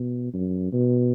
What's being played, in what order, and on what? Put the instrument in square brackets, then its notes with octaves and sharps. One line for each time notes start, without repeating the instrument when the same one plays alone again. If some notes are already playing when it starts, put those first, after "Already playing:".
Already playing: [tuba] B2
F#2
B2